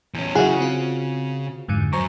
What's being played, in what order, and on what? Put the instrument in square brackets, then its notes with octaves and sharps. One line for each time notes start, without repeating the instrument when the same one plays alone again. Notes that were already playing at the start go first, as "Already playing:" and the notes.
[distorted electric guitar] E2 C#4
[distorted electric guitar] C#3 [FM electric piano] F#3 E4 F#5 [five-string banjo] F#4 G#4
[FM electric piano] C4 F4
F2 G#2 D3
[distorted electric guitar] F#2 [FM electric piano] C5 A#5 C#6